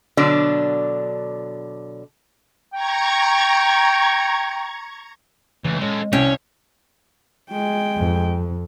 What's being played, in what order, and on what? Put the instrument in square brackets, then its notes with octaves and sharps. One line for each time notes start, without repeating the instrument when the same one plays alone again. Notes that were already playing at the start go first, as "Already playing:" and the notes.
[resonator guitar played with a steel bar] B2 D3 F#3 D4
[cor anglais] G5 [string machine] A#5 C#6 G#6
[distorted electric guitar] C#2 A3 [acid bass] E3
[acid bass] G#3 [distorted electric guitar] C#4 A4
[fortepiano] C2 G5 [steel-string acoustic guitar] C#4 [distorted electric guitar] C#5
[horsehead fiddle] G#3 G5
[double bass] F2